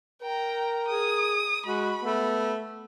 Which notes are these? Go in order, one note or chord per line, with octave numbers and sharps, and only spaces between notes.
A#4 G5 A#5
G#4 D#6
G#3 F#4 B5
A3 B3